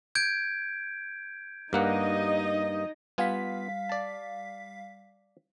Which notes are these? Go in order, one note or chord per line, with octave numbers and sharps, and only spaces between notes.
G6 G#6 D7
G2 A#3 D#4 D#5 F#5
G3 B3 F4 F5 G#5 B6
D5 A5